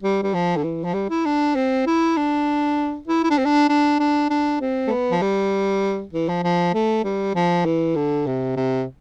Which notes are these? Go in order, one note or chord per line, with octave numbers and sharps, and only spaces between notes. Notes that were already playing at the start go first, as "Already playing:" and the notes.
G3
G3
F3
D3
E3
F3
G3
E4
D4
C4
E4
D4
E4
E4
D4
C4
D4
D4
D4
D4
C4
A3
B3
F3
G3
E3
F3
F3
A3
G3
F3
E3
D3
C3
C3